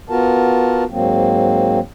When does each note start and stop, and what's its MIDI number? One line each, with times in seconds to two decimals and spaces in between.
0.10 0.84 59
0.10 0.84 65
0.10 0.84 66
0.10 0.84 70
0.10 0.84 81
0.91 1.79 44
0.91 1.79 54
0.91 1.79 58
0.91 1.79 60